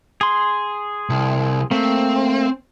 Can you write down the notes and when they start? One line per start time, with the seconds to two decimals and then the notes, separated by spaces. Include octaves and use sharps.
0.21 G#4 C6
1.10 C2
1.71 A3 A#3 C4